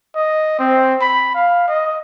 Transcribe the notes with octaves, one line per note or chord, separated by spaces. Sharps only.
D#5
C4
B5
F5
D#5